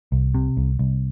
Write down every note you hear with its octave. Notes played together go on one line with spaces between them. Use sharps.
C2
C3
C2
C2